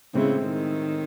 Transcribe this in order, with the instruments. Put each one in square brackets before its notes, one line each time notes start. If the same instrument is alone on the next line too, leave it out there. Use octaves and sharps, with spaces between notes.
[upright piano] A2 G#3 C4 E4 [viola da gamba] C#3
[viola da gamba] D#3